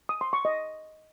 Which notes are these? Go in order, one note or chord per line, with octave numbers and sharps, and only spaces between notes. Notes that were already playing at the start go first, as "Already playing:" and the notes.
D#6
C6
C#6
D#5